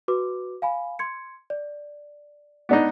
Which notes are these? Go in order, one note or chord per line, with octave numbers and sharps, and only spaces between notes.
F#4 B4 D6
F5 G#5 B5
C6 G#6 C#7
D5
B3 D4 D#4